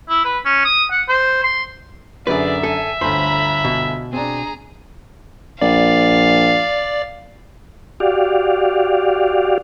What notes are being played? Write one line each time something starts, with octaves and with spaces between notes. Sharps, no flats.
E4
B4
C#4
D#6
F#5
C5
C6
F#2 D3 G#4 B4 D5 E5
A4 G#5
G1 D2 C5 A#5 B5
B2
C4 D4 G#4 A#5
A#1 D5 F5
F#4 G4 D5 F5